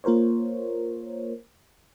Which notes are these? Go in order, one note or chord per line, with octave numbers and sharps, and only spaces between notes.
A#3 F4 A#4 C5 C#5